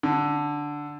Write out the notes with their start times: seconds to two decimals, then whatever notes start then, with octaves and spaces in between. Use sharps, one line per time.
0.03 D3